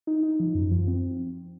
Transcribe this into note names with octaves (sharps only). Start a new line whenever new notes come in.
D#4
D#4
F3
F#2
F3
C4